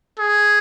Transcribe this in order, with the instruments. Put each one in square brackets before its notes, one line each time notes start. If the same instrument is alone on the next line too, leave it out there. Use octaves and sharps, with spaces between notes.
[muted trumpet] G#4